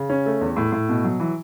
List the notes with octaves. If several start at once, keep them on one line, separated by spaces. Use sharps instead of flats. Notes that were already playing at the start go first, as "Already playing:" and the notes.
Already playing: C#3
C#4
A3
E2
A2
A2
B2
F#3
E3